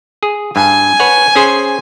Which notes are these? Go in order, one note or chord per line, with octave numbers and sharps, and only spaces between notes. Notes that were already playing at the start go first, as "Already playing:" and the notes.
G#4
G2 G#5
B4 C#5 F#5
C#4 G#4 C5